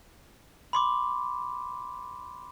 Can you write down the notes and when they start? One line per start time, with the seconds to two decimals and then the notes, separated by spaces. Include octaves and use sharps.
0.73 B5 C6 D6